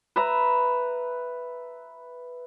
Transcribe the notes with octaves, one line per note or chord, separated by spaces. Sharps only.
B4 E5 A#5